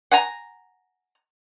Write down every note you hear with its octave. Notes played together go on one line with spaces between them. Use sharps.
F#5 G#5 A#5